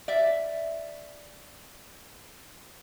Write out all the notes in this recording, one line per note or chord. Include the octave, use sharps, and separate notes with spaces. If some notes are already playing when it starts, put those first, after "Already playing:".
D5 E5